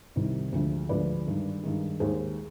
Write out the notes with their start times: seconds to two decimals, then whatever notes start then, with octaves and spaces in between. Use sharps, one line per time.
0.16 C2 C3 D#3 G3
0.52 D2 D3 F3 G#3
0.89 D2 D3 F3 G#3 B4 D5
1.26 G2 D#3 G#3
1.64 G2 D#3 G#3
2.00 D#2 D#3 G#3 G#4 C5